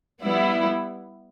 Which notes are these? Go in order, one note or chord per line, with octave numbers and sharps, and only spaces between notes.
G3 B3 E4